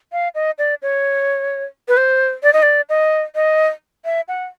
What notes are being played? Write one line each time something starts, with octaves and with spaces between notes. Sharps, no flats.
F5
D#5
D5
C#5
B4
C5
D5
D#5
D5
D#5
D#5
E5
F#5